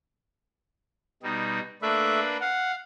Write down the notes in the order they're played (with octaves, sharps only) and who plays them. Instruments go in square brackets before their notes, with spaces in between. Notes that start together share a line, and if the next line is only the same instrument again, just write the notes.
[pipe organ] B2 G3 D#4
[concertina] A3 E5 [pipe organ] A#3 D4 B4
[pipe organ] F5 [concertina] F#5